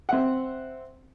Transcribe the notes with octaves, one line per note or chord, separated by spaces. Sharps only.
C4 E5 F#5